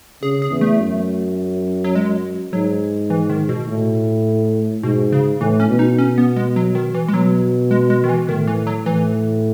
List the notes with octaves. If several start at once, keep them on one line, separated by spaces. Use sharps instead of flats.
C#3 G#4
G#4
E2
A3
F#2
F#3
G#3
G#2 F#3
E3
D#3
B2
A2
G#2 B2
C#3
A2 E3
C#4
B2
D#4
C#4
B3
G#3
F#3
D#3
E3
G#3
B2 F#3
G#3
G#3
D#3
E3
A2 D#3
E3
F#3
A2 E3